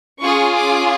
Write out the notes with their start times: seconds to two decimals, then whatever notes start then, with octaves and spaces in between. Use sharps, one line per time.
0.21 C#4 F4 G#4 C#6
0.55 D6